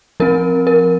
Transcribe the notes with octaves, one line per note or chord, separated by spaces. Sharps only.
F3 C4 A#4
A#4